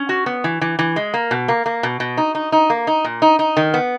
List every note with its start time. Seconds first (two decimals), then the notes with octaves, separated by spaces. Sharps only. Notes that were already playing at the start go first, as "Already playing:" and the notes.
Already playing: C#4
0.09 F#4
0.26 B3
0.44 E3
0.61 E3
0.79 E3
0.96 G#3
1.14 A#3
1.31 B2
1.48 A#3
1.66 A#3
1.83 B2
2.00 B2
2.17 D#4
2.35 D#4
2.52 D#4
2.70 A#3
2.87 D#4
3.04 A#2
3.22 D#4
3.39 D#4
3.57 D#3
3.74 B3